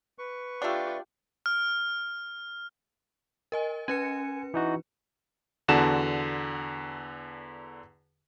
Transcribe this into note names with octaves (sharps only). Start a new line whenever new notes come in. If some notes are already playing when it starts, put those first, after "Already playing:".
B4 C#6
A3 D4 F4 G4
F6
A#4 D#5 G#5
C#4 B4 G#5 C#7
E3 D#4 F#4
E2 D3 F#4 A5 E7